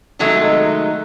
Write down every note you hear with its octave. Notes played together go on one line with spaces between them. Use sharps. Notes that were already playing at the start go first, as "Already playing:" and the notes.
C3 D#3 F#3 G#3 A3 D#4